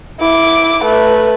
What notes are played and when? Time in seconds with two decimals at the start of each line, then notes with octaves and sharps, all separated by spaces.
0.20 E4 D6
0.84 A3 B4